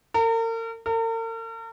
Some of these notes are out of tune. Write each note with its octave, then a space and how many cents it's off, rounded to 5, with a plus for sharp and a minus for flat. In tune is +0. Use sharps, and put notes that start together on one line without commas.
A#4 -40
A#4 -45